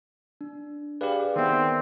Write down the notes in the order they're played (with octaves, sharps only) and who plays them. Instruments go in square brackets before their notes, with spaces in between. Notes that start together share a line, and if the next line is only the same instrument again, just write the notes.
[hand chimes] D4
[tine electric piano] G4 B4 [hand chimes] G#4 D5 F5
[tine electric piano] D#3 B3 [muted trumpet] C4 [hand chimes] A#4 D5 E5